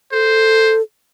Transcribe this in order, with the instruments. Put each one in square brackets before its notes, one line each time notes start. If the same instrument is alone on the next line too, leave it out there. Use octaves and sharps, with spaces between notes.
[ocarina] A4 [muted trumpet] C5